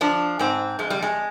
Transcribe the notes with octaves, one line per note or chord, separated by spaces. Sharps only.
F3 D4
G#2 C4
F2 G#3
G3
G#3